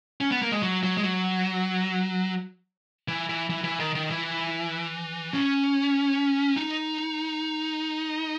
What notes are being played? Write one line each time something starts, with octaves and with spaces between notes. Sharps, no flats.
C#4
B3
A#3
G#3
F#3
F#3
G#3
F#3
E3
E3
E3
E3
D#3
D#3
E3
C#4
D#4